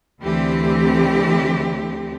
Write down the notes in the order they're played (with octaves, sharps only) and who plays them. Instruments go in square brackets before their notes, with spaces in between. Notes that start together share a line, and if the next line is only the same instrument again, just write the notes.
[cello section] D2 D3 E3 C4 G4